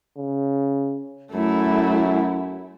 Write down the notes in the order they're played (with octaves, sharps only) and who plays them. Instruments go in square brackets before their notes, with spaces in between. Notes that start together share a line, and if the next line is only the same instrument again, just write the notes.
[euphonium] C#3
[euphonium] F#2 [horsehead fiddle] A3 E4